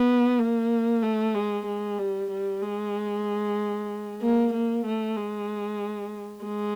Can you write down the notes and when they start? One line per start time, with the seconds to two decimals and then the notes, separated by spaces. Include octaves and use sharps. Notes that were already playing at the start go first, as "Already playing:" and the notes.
Already playing: B3
0.39 A#3
1.02 A3
1.34 G#3
1.66 G#3
1.98 G3
2.31 G3
2.62 G#3
4.22 A#3
4.53 A#3
4.85 A3
5.17 G#3
6.45 G#3